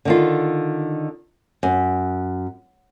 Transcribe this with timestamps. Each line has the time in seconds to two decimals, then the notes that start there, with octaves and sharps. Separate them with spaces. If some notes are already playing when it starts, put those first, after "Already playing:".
0.05 D3 D#3 F4
1.63 F#2